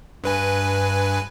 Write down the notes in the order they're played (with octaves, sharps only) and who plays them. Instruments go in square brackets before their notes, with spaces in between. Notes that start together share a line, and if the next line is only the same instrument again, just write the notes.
[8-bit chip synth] G2 B4 G#5